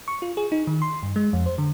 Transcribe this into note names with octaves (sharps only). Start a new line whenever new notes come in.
C#6
F4
G#4
D#4
D#3
C6
G2
G#3
F2
C5
D3